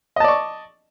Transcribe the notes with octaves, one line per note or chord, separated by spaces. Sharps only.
D5 D#5 A5 C#6